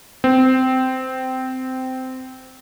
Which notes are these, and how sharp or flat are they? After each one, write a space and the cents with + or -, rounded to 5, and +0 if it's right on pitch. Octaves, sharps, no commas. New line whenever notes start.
C4 -15